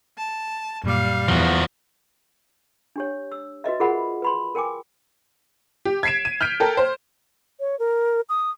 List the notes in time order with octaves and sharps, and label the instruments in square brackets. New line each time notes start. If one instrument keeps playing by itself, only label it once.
[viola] A5
[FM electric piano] F#2 A#2 D6 [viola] G3 F5
[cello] E2 [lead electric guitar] F3 F#4
[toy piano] D4 G4 C#5
E6
F#4 B4 D#5 E5
F4 G#4 A#4 C5 F#5 B5
B4 B5 C6
A#4 G5 G#5 D6
[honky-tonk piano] G4
G#6 B6 C7 D7 E7
D#7
F6 G6 B6 D7
A4 A#4 G5
C5
[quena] C#5
A#4
D#6